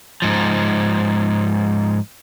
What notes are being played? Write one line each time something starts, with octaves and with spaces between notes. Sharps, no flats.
G#2 F3